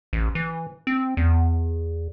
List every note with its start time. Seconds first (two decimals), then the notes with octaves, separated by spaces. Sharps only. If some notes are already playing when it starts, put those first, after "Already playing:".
0.13 A1
0.35 E3
0.87 C4
1.17 E2